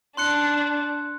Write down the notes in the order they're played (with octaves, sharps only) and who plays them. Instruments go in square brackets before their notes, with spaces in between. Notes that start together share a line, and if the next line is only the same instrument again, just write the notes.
[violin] D4 [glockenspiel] C6 F#6 C#7